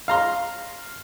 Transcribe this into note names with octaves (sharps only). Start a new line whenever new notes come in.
F5 A#5 C6